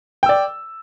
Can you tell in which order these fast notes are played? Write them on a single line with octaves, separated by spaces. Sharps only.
G5 E6 D5